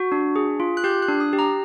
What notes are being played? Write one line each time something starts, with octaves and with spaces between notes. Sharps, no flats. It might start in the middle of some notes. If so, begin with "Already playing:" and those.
Already playing: F#4
D4
G#4
F4
F#6
G4 G6
F#6
D4
D#6
G4
A#5